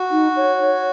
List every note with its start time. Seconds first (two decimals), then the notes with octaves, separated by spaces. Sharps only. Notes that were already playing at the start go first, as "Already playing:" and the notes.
Already playing: F#4
0.11 D#4
0.36 C#5
0.60 C#5